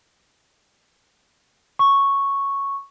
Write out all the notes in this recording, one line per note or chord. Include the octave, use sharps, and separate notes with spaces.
C#6